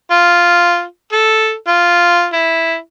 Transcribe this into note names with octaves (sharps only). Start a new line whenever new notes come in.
F4
A4
F4
E4